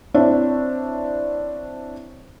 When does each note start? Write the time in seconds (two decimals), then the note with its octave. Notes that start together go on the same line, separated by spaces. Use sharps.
0.14 C4 D4 E4 C5 C#5 E5